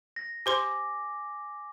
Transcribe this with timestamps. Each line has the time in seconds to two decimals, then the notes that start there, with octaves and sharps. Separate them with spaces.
0.16 A#6
0.46 G4 C5 G#5 C6 D6